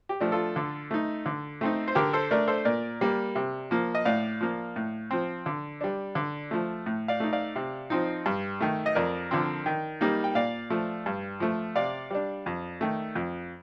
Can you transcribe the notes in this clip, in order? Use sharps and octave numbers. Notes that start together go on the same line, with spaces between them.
G4
F3 A3 D4
F4 A4
D3
A3 D#4
D3
A3 C4 D#4
C5
D3 G4 A#4
A4 C5
A3 D4 A#4 D5
A4 C5
A#2 A#4 D5
G3 A#3
C3
F3 A#3
D#5
A2 D5 F5
F3 A#3
A2
F3 C4
D3
G3 D4
D3
F3 A3
A2
D5 F5
A3 D#4
D5 F5
C3
F3 C4 D#4
G2
D#3 A3
D#5
F2 A#4 D5
D3 F3 C4
D#3
G3 A#3 D#4
G5
A#2 D5 F5
F3 A3
G2
F3 A3
C3 D5 F5
G3 D4
F2
D#3 A3
F2